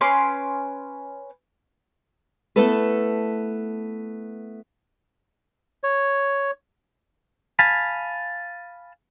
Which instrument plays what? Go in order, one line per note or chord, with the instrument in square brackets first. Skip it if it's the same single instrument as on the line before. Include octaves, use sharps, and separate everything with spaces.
[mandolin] C#4 B4 C6 D6
[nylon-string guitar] A3 B3 E4 A4 B4
[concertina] C#5
[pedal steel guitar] F5 G#5 A5 B5